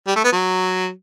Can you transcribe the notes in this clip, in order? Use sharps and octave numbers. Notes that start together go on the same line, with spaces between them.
G3
A3
B3
F#3